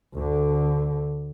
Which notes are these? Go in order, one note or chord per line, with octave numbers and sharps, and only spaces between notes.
D2 D3